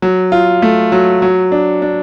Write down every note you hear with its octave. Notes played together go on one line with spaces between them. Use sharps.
F#3
F4
A3
F#3
F#3
D4
D4